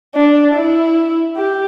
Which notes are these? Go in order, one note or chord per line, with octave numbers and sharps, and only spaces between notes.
D4
E4
G4